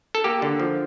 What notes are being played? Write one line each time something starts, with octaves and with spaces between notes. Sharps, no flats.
A4
A#3 G4
D3
F3